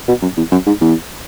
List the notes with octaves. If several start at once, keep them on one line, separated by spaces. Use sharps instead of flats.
B2
F#2
E2
F#2
G#2
E2